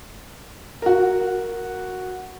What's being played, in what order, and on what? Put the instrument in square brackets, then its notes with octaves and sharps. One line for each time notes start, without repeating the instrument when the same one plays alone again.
[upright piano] F#4 A#4